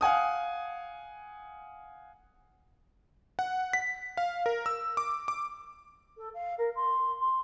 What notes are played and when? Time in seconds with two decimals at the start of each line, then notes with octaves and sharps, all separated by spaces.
0.01 F5 F#5 G#5 D#6
3.39 F#5
3.73 B6
4.17 F5
4.46 A#4
4.66 E6
4.97 D6
5.28 D6
6.17 A4
6.34 F5
6.58 A#4
6.75 C6
7.20 C6